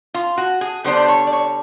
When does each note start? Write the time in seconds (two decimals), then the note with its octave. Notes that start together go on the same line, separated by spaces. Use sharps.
0.14 F4
0.38 F#4
0.61 G#4
0.84 D3 G3 B3 D4 C5
1.08 C#5
1.27 D5
1.33 C#5